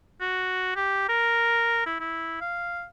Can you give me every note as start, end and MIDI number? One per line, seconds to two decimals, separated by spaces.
0.21 0.73 66
0.76 1.07 67
1.09 1.81 70
1.86 2.00 64
2.00 2.41 64
2.41 2.84 77